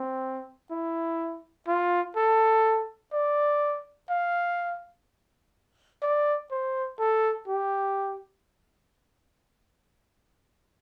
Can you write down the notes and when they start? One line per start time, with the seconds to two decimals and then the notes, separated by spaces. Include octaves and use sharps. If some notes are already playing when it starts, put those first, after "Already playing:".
Already playing: C4
0.71 E4
1.67 F4
2.16 A4
3.12 D5
4.10 F5
6.02 D5
6.51 C5
6.99 A4
7.47 G4